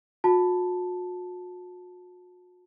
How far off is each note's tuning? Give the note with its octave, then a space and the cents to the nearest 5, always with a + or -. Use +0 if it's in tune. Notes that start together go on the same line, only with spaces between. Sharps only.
F#4 -40 A5 +0